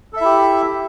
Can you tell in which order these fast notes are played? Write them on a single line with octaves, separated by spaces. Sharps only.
A4 E5 E4 G4